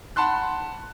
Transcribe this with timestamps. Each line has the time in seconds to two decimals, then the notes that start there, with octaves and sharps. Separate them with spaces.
0.16 F#5 A5 B5 C6 F#6